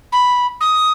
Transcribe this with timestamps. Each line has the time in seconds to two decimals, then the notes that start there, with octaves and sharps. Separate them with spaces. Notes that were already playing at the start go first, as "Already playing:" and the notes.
0.12 B5
0.61 D#6